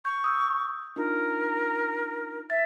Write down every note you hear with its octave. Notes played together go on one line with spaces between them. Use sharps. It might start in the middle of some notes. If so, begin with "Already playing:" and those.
C#6 G6
D#6 E6 G6
D4 D#4 F4 A#4
E5 A6